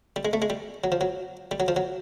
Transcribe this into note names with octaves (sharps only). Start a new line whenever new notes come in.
G3
G#3
A3
G#3
G3
F#3
F3
F#3
G3
F#3
F3
F#3